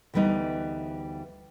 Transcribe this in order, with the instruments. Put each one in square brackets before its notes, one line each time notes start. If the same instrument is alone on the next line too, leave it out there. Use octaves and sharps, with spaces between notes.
[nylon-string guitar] D2 E3 G3 B3 D#4